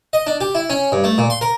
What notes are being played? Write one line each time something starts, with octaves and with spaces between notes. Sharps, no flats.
D#5
D4
G4
E4
C#4
G2
A3
A#2
C6
A#4